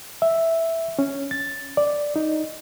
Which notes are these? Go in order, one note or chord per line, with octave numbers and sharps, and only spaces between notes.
E5
C#4
A6
D5
D#4